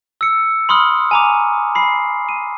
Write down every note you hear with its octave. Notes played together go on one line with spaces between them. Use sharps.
E6 C#7
B5 C6 D#6 F6
G#5 A#5 D6
B5 C7
D#7